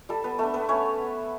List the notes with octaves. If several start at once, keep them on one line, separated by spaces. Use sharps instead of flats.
G3 A4 A5
B3 B4
A3 B3 D4 A4
B3 B4
A3 C#4 C#5